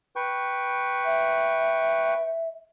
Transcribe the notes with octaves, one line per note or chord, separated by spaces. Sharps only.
B4 G5 C#6
E5